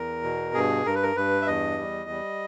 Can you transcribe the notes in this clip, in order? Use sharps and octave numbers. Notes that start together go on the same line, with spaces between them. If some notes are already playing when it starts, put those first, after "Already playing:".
Already playing: E2 A#4
B2
G2 G#4
G2 A#4
B4
A#4
G2 B4
E5
E2 D#5
G3
G3